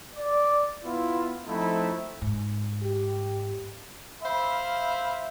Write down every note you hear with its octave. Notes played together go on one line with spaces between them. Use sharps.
D5
B3 E4 F4
F3 A3 C4 D#4 E4
G#2
G4
C5 E5 F5 B5